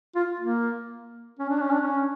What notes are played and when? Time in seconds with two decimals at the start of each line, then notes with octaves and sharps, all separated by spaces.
0.15 F4
0.40 A#3
1.39 C#4
1.49 D4
1.60 C#4
1.71 D4
1.81 C#4